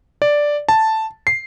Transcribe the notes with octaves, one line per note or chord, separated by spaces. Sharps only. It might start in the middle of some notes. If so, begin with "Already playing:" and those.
D5
A5
C7